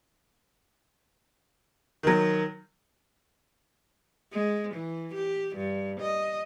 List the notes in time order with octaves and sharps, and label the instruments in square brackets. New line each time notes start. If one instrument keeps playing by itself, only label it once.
[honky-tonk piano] D#3 F#3
[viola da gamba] G#3
E3
G4
G2
D#5